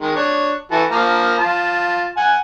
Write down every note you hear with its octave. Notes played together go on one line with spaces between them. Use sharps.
D#3 G#3
D4 C#5
E3 F#4 A4
F3 A#3 A#5
F4 A5
F#5 G#5